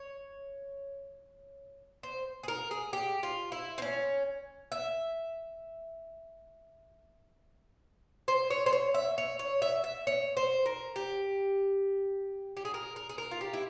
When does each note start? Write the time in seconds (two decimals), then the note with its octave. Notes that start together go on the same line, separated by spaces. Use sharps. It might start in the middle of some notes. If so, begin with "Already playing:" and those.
Already playing: C#5
2.03 C5
2.43 G#4
2.48 A#4
2.71 G#4
2.93 G4
3.23 F4
3.52 E4
3.78 C4
3.82 C#4
4.72 E5
8.28 C5
8.50 C#5
8.66 C5
8.73 C#5
8.94 E5
9.18 C#5
9.39 C#5
9.62 E5
9.84 E5
10.07 C#5
10.37 C5
10.66 A#4
10.96 G4
12.57 G4
12.65 G#4
12.74 A#4
12.96 A#4
13.09 G#4
13.18 A#4
13.31 F4
13.41 G4
13.53 E4